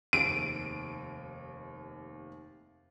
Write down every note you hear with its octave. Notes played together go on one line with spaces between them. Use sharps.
F1 D#2 D7